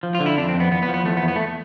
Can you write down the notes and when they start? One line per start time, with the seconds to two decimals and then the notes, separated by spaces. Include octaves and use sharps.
0.03 F3
0.15 F4
0.20 D3
0.26 E4
0.37 F2 D4
0.49 C4
0.54 F2
0.60 B3
0.71 E2 B3
0.83 B3
0.88 F3
0.94 B3
1.05 E2 A3
1.17 B3
1.22 E2
1.28 B3
1.36 A3